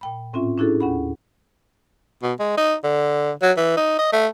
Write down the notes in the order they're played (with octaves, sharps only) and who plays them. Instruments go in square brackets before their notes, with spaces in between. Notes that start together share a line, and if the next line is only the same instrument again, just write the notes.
[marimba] A#2 G5 B5
A2 C4 C#4 F4 E5
C#4 D4 E4 F#4 G#4 A4
D#2 C#4 F#5 B5
[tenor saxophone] B2
G#3
D#4
D3
F#3
E3
D#4
D#5
A3